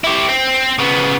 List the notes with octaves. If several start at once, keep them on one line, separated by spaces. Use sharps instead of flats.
E4 G4
C4
C#3 B3